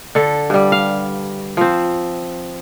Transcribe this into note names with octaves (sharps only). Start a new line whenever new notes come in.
D3 A4
G2 G3
F5
F3 C4